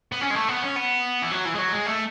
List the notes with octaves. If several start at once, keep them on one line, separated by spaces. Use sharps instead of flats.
B3
C#4
G#3
A3
B3
C#4
B3
E3
F#3
E3
G#3
F#3
G#3
A3